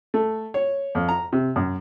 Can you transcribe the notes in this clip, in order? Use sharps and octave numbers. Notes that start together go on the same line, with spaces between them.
A3
C#5
F2
A#5
C3
F#2